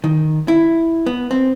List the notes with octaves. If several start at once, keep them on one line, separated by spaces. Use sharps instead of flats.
D#3
E4
B3
C4